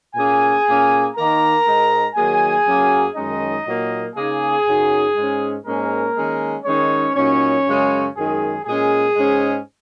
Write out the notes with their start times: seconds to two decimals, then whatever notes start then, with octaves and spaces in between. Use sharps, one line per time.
0.15 A#2 A#3 C#4 G#4 G#5
0.65 A#2 A#3 C#4
1.15 D#3 A#3 D#4 A#4 A#5
1.65 G#2 G#3 D#4
2.15 D#3 F#3 A#3 G#4 G#5
2.65 F#2 F#3 A#3 C#4
3.15 F#2 D#3 G#3 C#4 D#4 D#5
3.65 A#2 F#3 A#3 D#4
4.15 C#3 A#3 D#4 G#4
4.66 F#2 C#3 F#3 D#4
5.16 G#2 G#3 C#4
5.66 G#2 G#3 A#3 C#4 A#4
6.16 D#3 G#3 C#4
6.65 D#3 G#3 C#4 D#4 C#5
7.15 A#2 F#3 C#4 D#4 C#5
7.65 F#2 C#3 G#3 C#4
8.15 F#2 D#3 G#3 G#4
8.65 A#2 G#3 C#4 G#4
9.16 G#2 G#3 C#4